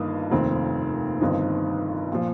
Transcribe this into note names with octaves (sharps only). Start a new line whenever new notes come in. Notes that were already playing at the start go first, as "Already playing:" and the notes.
Already playing: G1 G2 D#3 A#3 D#4
F1 D#2 D#3 C4
G1 G2 D#3 C4 D#4
A#2 F3